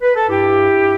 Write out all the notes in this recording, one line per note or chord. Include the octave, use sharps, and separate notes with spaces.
B4
A4
G2 E4 G4
G2